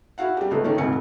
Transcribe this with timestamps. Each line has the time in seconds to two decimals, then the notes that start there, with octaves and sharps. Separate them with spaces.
0.18 E4 F#4 F5 F#5
0.37 G3 G4
0.51 C#2 B2 A3
0.64 A#2 D#3 A3 C#4 D#4
0.78 D#1 D2 G#2 C3 G#5 C#7